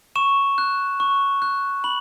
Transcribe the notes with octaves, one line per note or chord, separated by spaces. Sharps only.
C#6 E7
F#6
C#6
F#6
B5 F#7